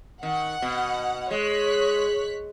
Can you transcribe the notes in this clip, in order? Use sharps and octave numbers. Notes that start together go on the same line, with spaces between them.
D#3 F#5
B2
G#3 C#5 F#6 B6